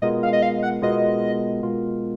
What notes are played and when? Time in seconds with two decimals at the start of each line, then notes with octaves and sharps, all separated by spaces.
0.02 B2 G#3 B3 F4 A#4 D#5
0.23 F5
0.33 D#5
0.42 F5
0.63 F#5
0.82 B2 G#3 B3 F4 A#4 D#5
1.63 B2 G#3 B3 F4 A#4